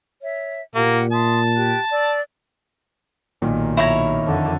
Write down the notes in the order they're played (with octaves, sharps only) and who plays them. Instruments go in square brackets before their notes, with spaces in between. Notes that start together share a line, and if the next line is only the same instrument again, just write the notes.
[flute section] C#5 E5
[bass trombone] A#2 [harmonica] A#3 [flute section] G4 F#5
[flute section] E5 C6 D#6 [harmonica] A5
[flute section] G4 G5 F#6
D5 E6
[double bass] B1 [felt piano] A#2 [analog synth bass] D#3
[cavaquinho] E4 C#5 A#5
[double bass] F2 D3